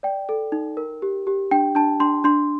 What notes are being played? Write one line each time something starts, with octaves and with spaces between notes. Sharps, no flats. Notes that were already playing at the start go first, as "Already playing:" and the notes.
D5 G5
A4
D#4
A#4
G4
G4
D4 G5
D4 A5
D4 C6
D4 C6